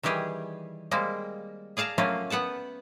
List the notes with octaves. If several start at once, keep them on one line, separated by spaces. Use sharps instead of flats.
D#3 E3 G3 G4 G#4
G3 G#3 A#3 C4
G#4 D5 F5 A5 A#5
F#3 A3 A#3 C#4 F4
B3 F#5 G5 A5